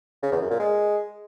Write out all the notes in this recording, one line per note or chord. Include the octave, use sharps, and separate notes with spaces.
C#3
E2
F#2
A#2
G#3